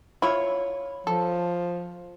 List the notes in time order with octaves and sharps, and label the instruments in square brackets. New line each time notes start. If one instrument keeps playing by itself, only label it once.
[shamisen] E4 [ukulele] F4 C#5
[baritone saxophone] F3 [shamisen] A4